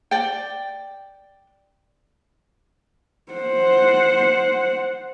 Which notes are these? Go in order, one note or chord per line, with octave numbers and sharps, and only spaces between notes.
D5 G5
C5 F#5